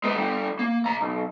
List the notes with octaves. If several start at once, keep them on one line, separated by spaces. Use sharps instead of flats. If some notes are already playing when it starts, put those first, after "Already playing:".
G#3 B4
D3 G3
A#3
B2 A#5
B1